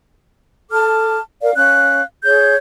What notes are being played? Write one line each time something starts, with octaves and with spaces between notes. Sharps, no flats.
A4 A5 D6 F6
A#4 D5 F5
C#4 F5 F#6
G#4 C#5 G6